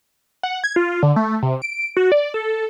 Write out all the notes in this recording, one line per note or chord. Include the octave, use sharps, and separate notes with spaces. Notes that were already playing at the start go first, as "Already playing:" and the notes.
F#5
G#6
F4
D3
A3
C3
D7
F#4
D5
A4